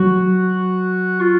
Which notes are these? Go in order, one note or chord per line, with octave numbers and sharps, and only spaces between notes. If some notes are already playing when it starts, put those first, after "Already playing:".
Already playing: F#3 F#4
F4